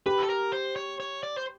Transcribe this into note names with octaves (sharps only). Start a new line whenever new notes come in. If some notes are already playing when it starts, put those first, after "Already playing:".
G4 B4
A4
A#4
C5
C#5
C#5
D5
C5